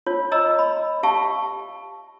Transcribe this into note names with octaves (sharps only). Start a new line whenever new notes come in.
F4 C#5
C#5 D#5 A#5 E6
B5
G4 E5 F5 A5 C#6